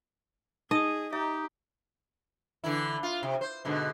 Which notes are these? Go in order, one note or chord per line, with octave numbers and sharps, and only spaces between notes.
D#4 G#4 D#5 D#6
D#4 G4 E5
D3 E3 E4
F4
C3
C5
G#2 B2 D3